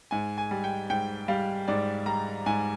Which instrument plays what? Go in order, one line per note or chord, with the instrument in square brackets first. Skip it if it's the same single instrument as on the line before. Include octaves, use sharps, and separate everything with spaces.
[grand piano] G#2 G#5
G#5
G3
G5
G#2 G5
G3 F5
G#2 D5
G3 A#5
G#2 G#5